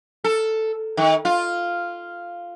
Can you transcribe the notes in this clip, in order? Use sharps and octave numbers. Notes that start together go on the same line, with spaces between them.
A4
D#3
F4